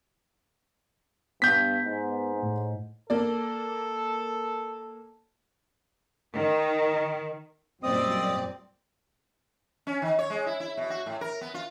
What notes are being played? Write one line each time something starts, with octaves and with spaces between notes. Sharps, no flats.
G2 B3 G6 B6
G#2
A2
A#3 A4 D5
D#3
F#2 A#2 G3 C4 D5 D#5 D#6
C#4
D#3
C#5
G#3
E4
E4
B2
F#4
A2
A#4
B3
F4